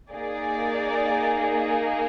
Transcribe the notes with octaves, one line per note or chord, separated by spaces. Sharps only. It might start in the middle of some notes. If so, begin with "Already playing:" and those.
A#3 D#4 G#4 D5